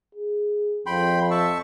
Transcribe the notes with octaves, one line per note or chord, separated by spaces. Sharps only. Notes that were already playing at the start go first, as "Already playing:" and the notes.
G#4
F2 G5 B5 C6
E5 A5 C#6